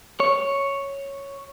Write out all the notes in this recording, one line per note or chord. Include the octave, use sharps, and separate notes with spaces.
C#5